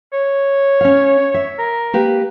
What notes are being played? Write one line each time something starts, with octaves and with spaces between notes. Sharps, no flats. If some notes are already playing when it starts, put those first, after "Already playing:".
C#5
C#4 F5
E5
A#4
A#3 G4 B4